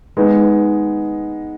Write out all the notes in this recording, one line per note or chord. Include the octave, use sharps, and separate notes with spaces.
G#3 B3 D#4